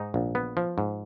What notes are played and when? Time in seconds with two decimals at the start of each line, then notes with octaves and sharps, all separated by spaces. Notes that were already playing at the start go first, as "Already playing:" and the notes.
Already playing: G#2 D#4
0.14 A#1
0.35 B3
0.57 F3
0.78 G#2